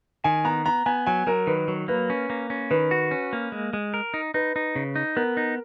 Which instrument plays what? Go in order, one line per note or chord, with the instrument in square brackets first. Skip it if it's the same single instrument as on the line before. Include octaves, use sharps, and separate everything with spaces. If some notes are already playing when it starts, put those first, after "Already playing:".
[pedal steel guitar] D#3 [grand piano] G#5
[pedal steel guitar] B3 [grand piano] A#5
[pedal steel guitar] B3 [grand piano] A#5
[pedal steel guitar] B3 [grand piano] G#5
[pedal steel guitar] F#3 [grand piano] G#5
[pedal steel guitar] F#3 [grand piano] A#4
[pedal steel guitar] D#3 [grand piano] B4
[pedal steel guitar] F#3
[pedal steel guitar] A#3 [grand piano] B4
[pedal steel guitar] C#4
A#3
C#4
[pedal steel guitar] D#3 [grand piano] B4
[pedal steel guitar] F#4
C#4
A#3
G#3
G#3
A#4
D#4
[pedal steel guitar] D#4 [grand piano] B4
[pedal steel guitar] D#4
C#3
D#4
[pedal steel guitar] B3 [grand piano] A#4
[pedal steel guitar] D#4